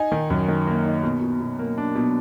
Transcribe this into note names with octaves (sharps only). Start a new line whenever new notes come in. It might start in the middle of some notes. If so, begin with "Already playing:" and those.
Already playing: D#4 G#5
D#3
F#2
D#3
A#3
D#4
B2
B2
B2
A#3
D4
B2